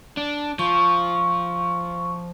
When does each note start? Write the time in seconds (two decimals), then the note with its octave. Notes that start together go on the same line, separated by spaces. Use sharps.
0.17 D4
0.59 F3 C#6